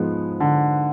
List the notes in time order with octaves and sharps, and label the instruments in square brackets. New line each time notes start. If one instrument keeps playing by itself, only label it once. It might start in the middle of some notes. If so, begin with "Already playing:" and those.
Already playing: [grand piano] G#2 F3 G#3 B3
[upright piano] D3